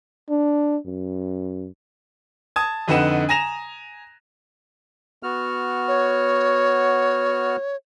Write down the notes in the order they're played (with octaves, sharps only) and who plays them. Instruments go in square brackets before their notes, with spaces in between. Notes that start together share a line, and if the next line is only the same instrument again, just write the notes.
[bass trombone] D4
F#2
[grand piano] A5 D#6 G#6
F2 D3 D#4 B4 F#5 E7
G#5 A#5 A#6 E7 F7
[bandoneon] B3 F#4 F6
[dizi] C#5